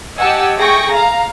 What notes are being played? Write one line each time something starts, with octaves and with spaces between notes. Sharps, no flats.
G4 D#5 F#5 G#5 A5 E6
A3 G#4 G5 C#6 A#6
F5 A#5